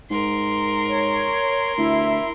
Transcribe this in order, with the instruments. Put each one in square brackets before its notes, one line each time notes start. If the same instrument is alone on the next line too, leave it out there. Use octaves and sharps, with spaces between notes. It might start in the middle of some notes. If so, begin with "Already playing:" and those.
[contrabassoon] G#2 [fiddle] A#4 C6
[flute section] C#5
[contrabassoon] D2 [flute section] E4